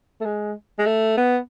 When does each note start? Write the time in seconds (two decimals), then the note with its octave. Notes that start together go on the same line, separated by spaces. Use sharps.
0.21 A3
0.25 G#3
0.79 G#3
0.86 A3
1.17 B3